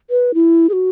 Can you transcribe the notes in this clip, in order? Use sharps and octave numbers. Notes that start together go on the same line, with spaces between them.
B4
E4
G#4
F#4